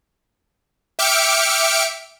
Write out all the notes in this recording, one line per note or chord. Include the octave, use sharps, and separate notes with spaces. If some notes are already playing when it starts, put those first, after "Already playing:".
E5 G5 D6 F6 C#7 D7